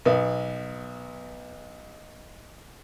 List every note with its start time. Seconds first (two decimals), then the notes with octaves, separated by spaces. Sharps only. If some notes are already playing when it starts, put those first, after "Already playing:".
0.05 B1 B3